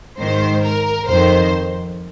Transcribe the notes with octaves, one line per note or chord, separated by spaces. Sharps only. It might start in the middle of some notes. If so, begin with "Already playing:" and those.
G#2 D#3 C5
A#4
F2 D#3 C5